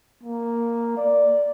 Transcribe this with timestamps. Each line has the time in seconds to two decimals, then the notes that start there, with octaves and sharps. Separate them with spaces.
0.23 A#3
0.97 D5